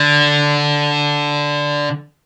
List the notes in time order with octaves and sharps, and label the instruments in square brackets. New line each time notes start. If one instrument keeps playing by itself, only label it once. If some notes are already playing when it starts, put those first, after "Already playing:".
Already playing: [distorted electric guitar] D3